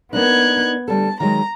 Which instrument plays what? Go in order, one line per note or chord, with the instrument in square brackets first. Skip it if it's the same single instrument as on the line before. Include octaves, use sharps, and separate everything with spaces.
[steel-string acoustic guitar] A#3 D4 D#4 [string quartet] B3 F#6 G#6
[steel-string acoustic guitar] D2 G3 A4 [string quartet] A5
[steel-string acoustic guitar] D#3 F#3 G#3 [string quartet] A#5